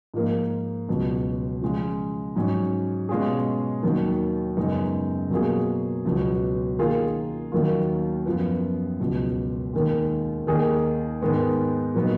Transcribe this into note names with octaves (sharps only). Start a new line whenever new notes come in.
G#2 F3 A#3 D#4
C#2 B2 F#3
C#3 F3 G#3
G#2 F#3 C#4
B2 G#3 C#4 F4 G#4
D#2 D#3 F#3
F#2 C#3 G#3 B3 D#4
B2 F#3 A#3 F4 G#4
C#2 B2 F#3 B3
D#3 A#3 F4 G#4
D#2 D#3 F#3 A#3 F4
F#2 F3 B3
C#2 B2 F#3
D#2 D#3 G#3
D#2 D#3 A#3 D#4 G#4
G#2 D#3 G#3 B3
A#2 F#3 B3 D#4